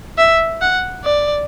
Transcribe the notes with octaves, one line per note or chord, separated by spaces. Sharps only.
E5
F#5
D5